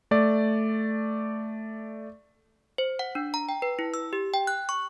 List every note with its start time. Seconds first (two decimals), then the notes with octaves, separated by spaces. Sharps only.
0.11 A3 D5
2.78 C5
2.99 F#5
3.15 D4
3.34 A#5
3.49 G5
3.62 B4
3.79 E4
3.94 E6
4.13 G4
4.34 G5
4.47 F#6
4.69 C#6